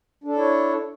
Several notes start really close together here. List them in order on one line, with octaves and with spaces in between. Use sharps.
D4 A4 E4 C#5